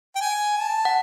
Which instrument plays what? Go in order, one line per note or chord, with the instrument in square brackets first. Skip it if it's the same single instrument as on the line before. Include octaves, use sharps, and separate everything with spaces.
[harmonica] G5
G#5
A5
[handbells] F#5